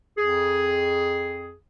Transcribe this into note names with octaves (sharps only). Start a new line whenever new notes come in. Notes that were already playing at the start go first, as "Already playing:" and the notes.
F2 G#4